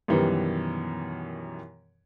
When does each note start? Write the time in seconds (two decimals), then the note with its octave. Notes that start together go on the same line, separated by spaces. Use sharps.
0.08 F#2 B2 D#3 E3 G3